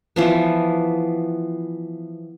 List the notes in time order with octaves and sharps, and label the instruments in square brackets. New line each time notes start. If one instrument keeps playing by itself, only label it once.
[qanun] E3 F3 B3